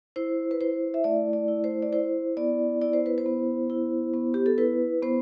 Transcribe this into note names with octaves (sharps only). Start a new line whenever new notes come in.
E4 C5
B4
E4 C5
E5
A3 D5
D5
E4
C5
D5
E4 C5
B3 D5
E4 D5
C5
B4
C5
B3
E4
B3
G4
A4
E4 B4
B3 C5